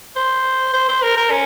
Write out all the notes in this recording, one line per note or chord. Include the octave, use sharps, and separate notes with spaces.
C5
C5
C5
A#4
A#4
C#4